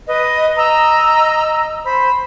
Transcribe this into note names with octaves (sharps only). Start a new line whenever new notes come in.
B4 D#5
D#5 A#5 E6
C5 B5